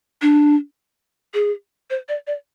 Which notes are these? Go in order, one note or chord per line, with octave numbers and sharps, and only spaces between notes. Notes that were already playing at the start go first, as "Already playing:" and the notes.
D4
G#4
C5
D5
D5